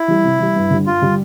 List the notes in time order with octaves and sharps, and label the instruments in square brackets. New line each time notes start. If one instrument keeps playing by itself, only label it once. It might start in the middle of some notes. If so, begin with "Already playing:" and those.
Already playing: [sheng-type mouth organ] E4
[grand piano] E3 G3
C3
E3 G3
G2
D3 G3 D4
[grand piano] G2 [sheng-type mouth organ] F4
[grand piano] D3 G3 D4